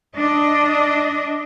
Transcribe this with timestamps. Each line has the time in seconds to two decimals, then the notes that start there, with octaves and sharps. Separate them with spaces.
0.15 D4 D#5